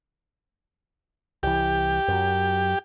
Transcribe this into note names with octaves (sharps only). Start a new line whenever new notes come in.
C2 E3 G4
F#2 F#3